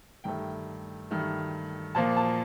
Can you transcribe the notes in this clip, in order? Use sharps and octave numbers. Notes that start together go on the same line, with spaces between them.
G2 D#3 A3 G5
G2 D#3 A3
A#2 F3 A#3 A5
A5